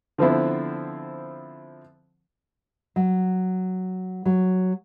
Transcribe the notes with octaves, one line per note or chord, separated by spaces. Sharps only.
D3 F3 B3 C4 E4
F#3
F#3